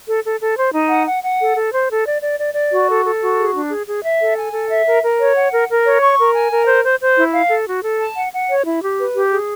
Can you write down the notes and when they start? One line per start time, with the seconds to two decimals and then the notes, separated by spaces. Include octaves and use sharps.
0.07 A4
0.24 A4
0.41 A4
0.57 C5
0.74 D#4
0.90 F#5
1.07 F#5
1.23 F#5
1.40 A4
1.56 A4
1.73 C5
1.90 A4
2.06 D5
2.22 D5
2.39 D5
2.55 D5
2.71 F#4
2.89 A4
3.05 A4
3.21 F#4
3.38 G#4
3.54 D4
3.70 G#4
3.87 G#4
4.04 E5
4.20 A4
4.37 G#5
4.54 A4
4.70 E5
4.87 A#4
5.03 A#4
5.19 C#5
5.36 F#5
5.52 A#4
5.69 A#4
5.85 C#5
6.02 C#6
6.19 A#4
6.34 G#5
6.51 A#4
6.68 C5
6.85 C5
7.01 C5
7.17 E4
7.33 F5
7.50 A4
7.67 F#4
7.83 A4
8.00 A5
8.16 F#5
8.33 F#5
8.49 C#5
8.66 E4
8.83 G4
8.99 B4
9.15 G4
9.32 G#4